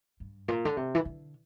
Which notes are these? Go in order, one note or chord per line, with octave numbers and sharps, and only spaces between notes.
G2
A#2
D3
C3
E3
D3